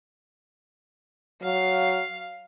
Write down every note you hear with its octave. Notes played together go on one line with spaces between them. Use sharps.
F#3 F5